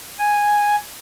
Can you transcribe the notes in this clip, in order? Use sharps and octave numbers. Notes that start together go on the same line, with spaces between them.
G#5